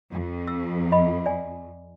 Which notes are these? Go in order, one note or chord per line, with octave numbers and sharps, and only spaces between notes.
F2
E6
D#5 B5
D5 G#5